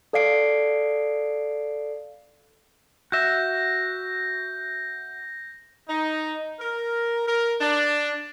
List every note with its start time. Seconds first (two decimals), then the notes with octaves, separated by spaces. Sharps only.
0.13 A4 D5 F5 C7 D7
3.12 F#4 E5 G6 A#6
5.89 D#4
6.60 A#4
7.27 A#4
7.61 D4